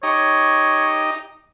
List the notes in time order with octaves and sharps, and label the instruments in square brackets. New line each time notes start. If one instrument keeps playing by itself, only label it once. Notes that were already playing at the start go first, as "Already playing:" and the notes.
[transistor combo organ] D#4 G4 D#5 [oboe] C#5